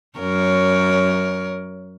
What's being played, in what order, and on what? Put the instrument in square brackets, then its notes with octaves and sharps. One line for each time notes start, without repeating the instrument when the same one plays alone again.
[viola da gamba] F#2 A#4 C#5